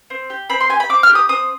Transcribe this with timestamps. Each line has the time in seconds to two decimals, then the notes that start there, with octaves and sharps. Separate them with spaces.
0.10 C4
0.30 G4
0.50 C4 B5
0.60 C6
0.69 G4 G#5
0.80 B5
0.89 C4 D6
1.03 F6
1.09 G4
1.15 D#6
1.29 C4 D#6